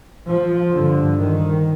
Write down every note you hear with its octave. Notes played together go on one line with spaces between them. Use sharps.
F3
G2 D3
D#3